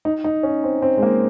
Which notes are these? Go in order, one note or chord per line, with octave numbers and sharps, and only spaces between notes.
D#4
D#4
C#4
C4
C4
G#3
A#3